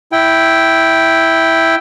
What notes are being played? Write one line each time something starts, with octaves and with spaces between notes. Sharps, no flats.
E4 G5